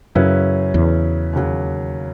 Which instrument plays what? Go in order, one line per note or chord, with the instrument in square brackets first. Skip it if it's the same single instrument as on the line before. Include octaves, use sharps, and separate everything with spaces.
[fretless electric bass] F#2 [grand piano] C#3 F#3 C#4 E4 B4
[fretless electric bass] E2
[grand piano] D#2 C#3 F#3